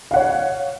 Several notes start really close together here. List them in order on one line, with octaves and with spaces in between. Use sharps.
F5 F#5 C#5